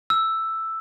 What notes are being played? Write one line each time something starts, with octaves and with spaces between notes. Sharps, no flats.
E6